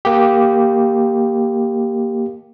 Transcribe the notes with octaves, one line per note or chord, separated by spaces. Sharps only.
A#3 G4